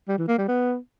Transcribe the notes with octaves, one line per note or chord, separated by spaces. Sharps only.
G3
E3
A#3
G3
B3